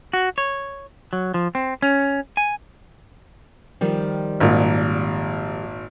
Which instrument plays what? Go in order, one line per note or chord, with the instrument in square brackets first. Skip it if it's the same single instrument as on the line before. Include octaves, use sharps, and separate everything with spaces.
[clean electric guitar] F#4
C#5
F#3
F3
C4
C#4
G#5
[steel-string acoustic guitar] D#3 F3 G3
[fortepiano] G#1 A#2